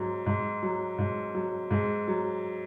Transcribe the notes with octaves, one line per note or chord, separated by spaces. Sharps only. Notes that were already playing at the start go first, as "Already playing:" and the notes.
Already playing: G#2 F#3
G#2
F#3
G#2
F#3
G#2 G#3
F#3